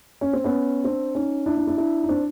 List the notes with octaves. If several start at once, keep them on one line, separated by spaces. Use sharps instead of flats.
C#4
C4
B3 C#4
C4 D4
C#4 D#4
D4 E4
D4 E4
D4 E4
D4 E4
D#4
C4 D4